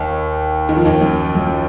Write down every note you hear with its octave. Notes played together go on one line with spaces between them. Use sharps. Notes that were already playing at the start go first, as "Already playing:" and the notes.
Already playing: D#2 D#3
D#3
F3
D#2 D#3
F#2
F#2